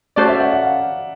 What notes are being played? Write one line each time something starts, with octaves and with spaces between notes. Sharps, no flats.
C#4 F#4 A4 C5 D5
E5
F#5
F#5
F5